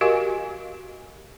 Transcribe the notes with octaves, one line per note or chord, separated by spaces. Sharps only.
F#4 G4 A#4 D#5 F5 G#5